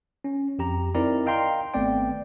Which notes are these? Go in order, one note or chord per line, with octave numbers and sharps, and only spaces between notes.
C#4
F2 G4 A#5
C4 D#4 E4 A#4 D5 A#5
D#5 F5 G5 A#5 C6
G#1 A3 B3 C4 D5 G5